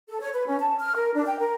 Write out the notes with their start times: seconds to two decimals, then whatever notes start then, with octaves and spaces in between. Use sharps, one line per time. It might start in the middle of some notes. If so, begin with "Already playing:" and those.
0.09 A4
0.21 C#5
0.34 B4
0.47 C#4
0.60 A5
0.80 F6
0.96 A#4
1.14 D4
1.26 G5
1.39 A#4